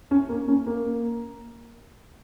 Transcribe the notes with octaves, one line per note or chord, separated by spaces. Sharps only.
C#4
A#3
C#4
A#3